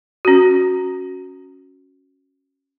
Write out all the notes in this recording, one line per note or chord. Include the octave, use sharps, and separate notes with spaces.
C#4 F#4